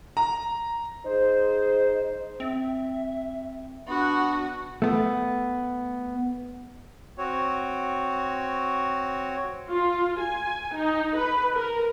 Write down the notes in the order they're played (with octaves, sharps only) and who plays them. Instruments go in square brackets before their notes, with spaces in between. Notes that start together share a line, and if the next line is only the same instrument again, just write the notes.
[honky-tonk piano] A#5
[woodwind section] D#4 G#4 C5
[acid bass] C4 [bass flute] E5
[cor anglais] B3 [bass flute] D4 [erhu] F#4
[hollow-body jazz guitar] A3 B3
[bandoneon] C4 F#4 C#5
[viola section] F4
G#5
D#4
B4
A#4